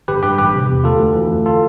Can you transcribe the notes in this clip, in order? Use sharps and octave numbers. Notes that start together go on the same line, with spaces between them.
G1 G4 B4
G2 G4 B4
A1 G4 B4
C3
E2
D2 F4 A4
D2
E3
F2
F4 A4